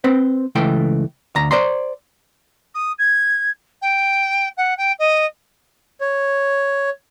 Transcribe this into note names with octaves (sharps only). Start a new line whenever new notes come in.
C4 B4 C5
C#2 E3 A3 G5
D2 A#5
C5 D5 A#5 C6
D#6
G#6
G5
F#5
G5
D#5
C#5